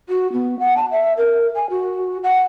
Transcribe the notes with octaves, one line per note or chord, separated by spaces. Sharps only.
F#4
B3
F#5
A5
E5
A#4
G#5
F#4
F#5